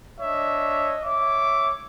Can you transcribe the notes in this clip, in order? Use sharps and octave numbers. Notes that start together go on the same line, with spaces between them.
D4 C#5 D#5 E5
C#5 E5 D6